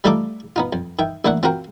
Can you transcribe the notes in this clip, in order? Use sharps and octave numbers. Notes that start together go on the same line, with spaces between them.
G3 A3 D#4 F4 A4 D6
B3 D#4 F4
F2
D#3 E5 G5
A1 A#3 D4 E5 F#5
C4 F4 F#4 A#4 G5